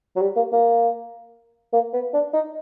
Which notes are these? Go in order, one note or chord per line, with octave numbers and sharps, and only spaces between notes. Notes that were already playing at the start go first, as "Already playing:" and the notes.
F#3
G3
A#3
A#3
A#3
B3
D4
D#4